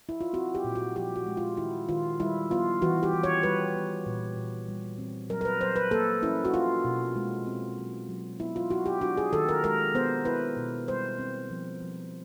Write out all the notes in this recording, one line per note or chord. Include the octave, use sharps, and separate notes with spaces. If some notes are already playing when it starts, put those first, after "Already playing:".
E4
F4
C4 F#4
G4
A#2
F#4
F3 G4
F#4
G#3
F4
D#3 E4
D#3 F4
G3 E4
B3 F4
E3 F#4
G4
E3
C#5
G3 B4
B3
A#2
A#2
G3
C4
F#3 A#4
A#4
B4
F#3 C5
B4
A#3 A4
C#4 E4
F#4
E4 F4
B2
G#3
C4
F#3
F#3
B3 E4
F4
E4 F#4
G4
D4 F#4
G#4
D#3 A4
A#4
G#3 A#4
B3 C5
E4 B4
B2
G3 C5
C4
F3
F3